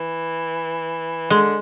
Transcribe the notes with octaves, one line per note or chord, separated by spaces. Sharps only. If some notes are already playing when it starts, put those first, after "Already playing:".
Already playing: E3
D3 G#3